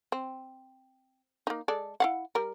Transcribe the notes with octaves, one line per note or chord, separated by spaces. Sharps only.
C4
A#3 D#4
G#3 A4 D5
E4 F5 F#5
G3 A#4